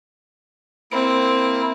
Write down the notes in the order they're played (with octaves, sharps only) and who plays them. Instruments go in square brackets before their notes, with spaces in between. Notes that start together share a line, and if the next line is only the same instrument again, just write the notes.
[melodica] A#3 E4 [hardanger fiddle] C4